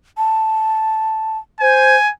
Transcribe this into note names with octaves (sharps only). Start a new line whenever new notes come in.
A5
C5 G#5 G#6